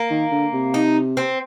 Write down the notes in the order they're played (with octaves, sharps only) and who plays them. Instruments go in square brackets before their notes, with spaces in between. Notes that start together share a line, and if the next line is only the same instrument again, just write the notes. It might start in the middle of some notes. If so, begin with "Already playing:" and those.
Already playing: [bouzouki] A#3
[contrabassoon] D#3
D3
C3
[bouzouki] D#4
C4